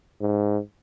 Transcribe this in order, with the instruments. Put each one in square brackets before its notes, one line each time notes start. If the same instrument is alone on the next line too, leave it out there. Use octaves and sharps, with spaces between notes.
[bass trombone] G#2